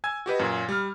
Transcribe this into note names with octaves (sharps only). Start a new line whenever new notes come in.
G#5 E6 G#6
F#4 G4 B4 D#5
F#2 A#2
G3 F6